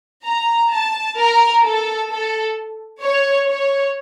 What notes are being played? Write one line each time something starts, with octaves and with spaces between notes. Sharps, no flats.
A#5
A5
A#4
A4
A4
C#5
C#5